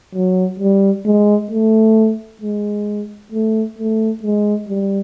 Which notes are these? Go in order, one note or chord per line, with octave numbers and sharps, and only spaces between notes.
F#3
G3
G#3
A3
G#3
A3
A3
G#3
G3